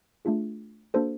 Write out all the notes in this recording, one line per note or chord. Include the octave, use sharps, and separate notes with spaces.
A3 D4 F4 G#4
A#3 D4 F#4 A4 C5